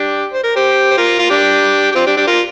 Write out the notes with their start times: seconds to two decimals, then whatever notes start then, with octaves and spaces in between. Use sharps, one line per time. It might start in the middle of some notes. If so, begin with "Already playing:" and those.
Already playing: D4 G4
0.33 C5
0.43 A#4
0.56 G4 C5
0.91 C5
0.97 F4 A#4
1.19 F4
1.30 D4 G4
1.92 G4
1.95 C4 F4
2.06 D4 G4
2.16 D4 G4
2.27 F4 A#4